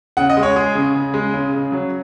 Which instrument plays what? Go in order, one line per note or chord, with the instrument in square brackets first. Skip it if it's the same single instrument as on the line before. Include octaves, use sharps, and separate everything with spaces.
[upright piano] C#3 F#5
D#5
G#3
C#5
G#3 G#4
C#3
C#3
G#3
C#3
C#3
F#3